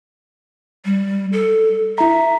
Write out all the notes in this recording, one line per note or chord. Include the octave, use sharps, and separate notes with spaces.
G3
A4
E4 E5 A#5